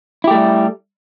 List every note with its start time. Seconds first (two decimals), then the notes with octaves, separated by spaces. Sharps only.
0.24 E4
0.27 G4
0.31 A3
0.34 G3